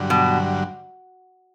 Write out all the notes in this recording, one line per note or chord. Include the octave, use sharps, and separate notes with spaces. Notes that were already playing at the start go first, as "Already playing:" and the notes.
Already playing: G2 D3 F#3
B2